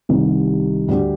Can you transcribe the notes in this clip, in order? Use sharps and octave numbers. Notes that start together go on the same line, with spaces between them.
C2 C3 D#3
D2 D3 G3 D4 G4